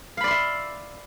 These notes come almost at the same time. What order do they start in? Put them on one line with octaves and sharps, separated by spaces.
F5 B5 D5 C6 E5